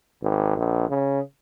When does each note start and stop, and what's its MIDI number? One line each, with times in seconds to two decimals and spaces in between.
0.22 0.52 32
0.57 0.88 34
0.89 1.20 49